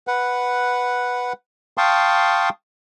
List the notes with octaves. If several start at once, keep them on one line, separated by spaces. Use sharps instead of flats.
B4 F#5
F5 G5 A5 C6 C#6 D#6